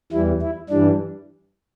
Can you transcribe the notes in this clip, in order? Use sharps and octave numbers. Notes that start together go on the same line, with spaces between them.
E2 E3 G3 E4
E4
G2 E3 G3 D4